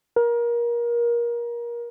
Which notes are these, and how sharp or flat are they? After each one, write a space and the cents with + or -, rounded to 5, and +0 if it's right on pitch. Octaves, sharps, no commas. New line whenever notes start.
A#4 +25